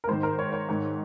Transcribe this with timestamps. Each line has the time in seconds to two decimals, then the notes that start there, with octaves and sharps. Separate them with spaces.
0.04 A#4
0.08 G#2 D#3 C5
0.23 A#4
0.39 C#5
0.53 C#5
0.69 G#2 D#3